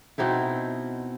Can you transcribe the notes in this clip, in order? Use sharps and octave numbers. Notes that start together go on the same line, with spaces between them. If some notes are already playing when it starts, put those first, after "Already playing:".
B2 C4 D#4 E4